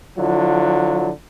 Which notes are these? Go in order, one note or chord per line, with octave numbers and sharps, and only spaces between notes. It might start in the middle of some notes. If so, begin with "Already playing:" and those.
D3 F3 F#3 E4 F4